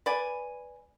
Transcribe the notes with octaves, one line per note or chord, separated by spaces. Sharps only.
B4 D5 G#5